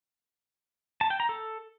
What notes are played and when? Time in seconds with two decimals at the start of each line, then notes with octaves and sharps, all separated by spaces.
1.01 A5
1.10 G5
1.20 A#5
1.29 A4